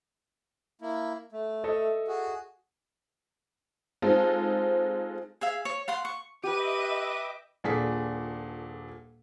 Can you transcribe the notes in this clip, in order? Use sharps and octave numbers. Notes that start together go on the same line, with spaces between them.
A#3 E4
A3
A4 D#5 E5
F#4 G#4
G#3 C4 D#4 F4 A4
G#4 E5 F5
C#5
F5 F#5 C6
C#6
G4 B4 D#5 E5 D6 D#7
D#1 A#2 D4 G#4 A4 B6